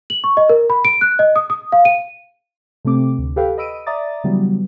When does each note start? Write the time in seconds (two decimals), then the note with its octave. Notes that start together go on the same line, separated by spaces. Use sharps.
0.10 F#7
0.24 C#6
0.37 D#5
0.49 A#4
0.70 B5
0.85 D7
1.01 F#6
1.19 D#5
1.36 D#6
1.50 D#6
1.72 F5
1.85 D#7
2.85 C3 A3 C4 D6
3.19 D2
3.36 G4 A4 B4 F5 G5
3.58 D#5 B5 E6 D7 D#7
3.87 D5 E5 A#5 D6 D#6 A6
4.24 C#3 E3 F#3 G3 B3